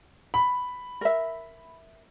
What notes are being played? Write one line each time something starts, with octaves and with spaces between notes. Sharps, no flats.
B5
A#4 E5